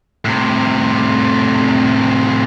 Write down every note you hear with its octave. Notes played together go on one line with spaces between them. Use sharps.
A2 C3